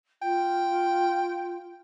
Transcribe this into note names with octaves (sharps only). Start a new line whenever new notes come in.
F4 G5